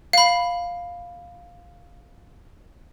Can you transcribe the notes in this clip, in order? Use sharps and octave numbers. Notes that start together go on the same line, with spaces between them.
F5 B5